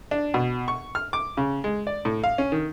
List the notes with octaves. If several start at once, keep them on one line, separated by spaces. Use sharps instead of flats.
D4
B2
C#6
F6
D6
C#3
G#3
D5
A2
F5
C#4
D#3